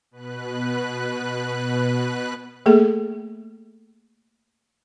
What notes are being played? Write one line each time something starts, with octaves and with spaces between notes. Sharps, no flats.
B2 B4 F#6
A3 A#3 G#4 A4